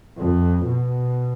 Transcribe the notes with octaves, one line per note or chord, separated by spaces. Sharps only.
F2
B2